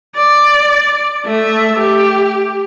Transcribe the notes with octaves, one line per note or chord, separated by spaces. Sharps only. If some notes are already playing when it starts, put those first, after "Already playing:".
D5
A3 E5
G4